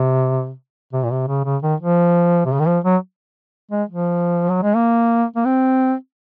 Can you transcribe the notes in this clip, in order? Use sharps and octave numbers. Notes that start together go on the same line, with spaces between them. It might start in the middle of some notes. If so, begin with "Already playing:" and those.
Already playing: C3
C3
A#2
C3
C#3
C#3
D#3
F3
C3
C#3
D#3
F3
F#3
G#3
F3
F#3
G#3
A#3
A#3
C4